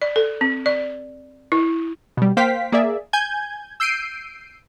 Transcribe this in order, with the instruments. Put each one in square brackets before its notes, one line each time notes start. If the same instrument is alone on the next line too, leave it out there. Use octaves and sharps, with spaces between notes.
[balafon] D5
A4
C4
D5
E4
[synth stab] B2 G3
A#3 C5 F5 G5 B6
A#3 G#4 D5 E5
G#5 G6 G#6
E6 G6 C7 D7 D#7